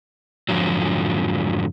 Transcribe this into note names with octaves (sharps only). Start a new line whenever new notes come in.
F2 G#2 B2 D3 F3 F#3